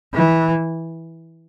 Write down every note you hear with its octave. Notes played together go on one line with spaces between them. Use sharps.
E3